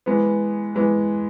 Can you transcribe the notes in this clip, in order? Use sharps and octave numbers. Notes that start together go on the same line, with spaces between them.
E3 G#3 B3
E3 G#3 B3